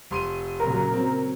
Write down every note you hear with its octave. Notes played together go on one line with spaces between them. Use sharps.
F1 C6 D#7
A#2 C#3 F#3 A#4
F#3 C4